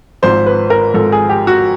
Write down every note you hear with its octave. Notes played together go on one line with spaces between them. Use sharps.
G#1 G#2 F3 C5
B4
A#4
G#1 G#2 F3 A4
G#4
G4
F#4